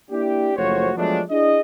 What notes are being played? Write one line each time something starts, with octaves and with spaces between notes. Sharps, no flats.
A#3 D4 E4 G4
F#1 F3 A3 F#4 C5 C#5
F3 F#3 G#3 A3 B3 D4
D4 E4 G#4 D#5